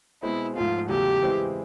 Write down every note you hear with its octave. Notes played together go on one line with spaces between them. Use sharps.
B2 G#3 C4 E4
G#2 F3 A3 F4
E2 C#3 F#3 A3 G4
E3 G#3 C4 E4